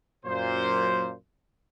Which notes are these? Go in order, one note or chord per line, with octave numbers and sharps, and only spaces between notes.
F#2 A#2 C5